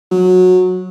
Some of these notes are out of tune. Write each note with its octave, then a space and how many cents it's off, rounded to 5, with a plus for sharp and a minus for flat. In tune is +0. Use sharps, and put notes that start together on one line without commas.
F#3 -15